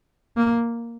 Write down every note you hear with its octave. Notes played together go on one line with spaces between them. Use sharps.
A#3